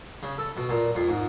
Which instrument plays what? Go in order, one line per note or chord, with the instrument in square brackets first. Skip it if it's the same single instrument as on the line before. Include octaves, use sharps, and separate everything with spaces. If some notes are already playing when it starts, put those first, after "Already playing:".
[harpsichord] C#3
A4
B2
A#2
F2
G#2